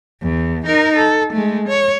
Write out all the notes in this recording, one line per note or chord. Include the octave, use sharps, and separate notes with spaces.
E2
D#4 A#4
A4
G#3 A3
C#5